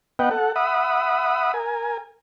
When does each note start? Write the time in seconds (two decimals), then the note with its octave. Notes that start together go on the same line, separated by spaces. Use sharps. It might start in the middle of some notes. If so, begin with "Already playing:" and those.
0.19 B3 B4 D#5 F#5 G5
0.31 A4 F#5
0.56 E5 F#5 B5 D#6
1.54 A#4 G#5